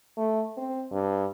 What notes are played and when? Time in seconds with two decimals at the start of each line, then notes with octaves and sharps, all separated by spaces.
0.17 A3
0.57 C4
0.91 G2